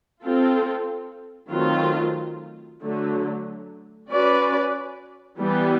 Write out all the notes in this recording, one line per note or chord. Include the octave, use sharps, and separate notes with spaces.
C4 F4 A4
D#3 F#3 A3 C4 F4
D3 F#3 A3
C#4 F#4 B4 D5
E3 G3 B3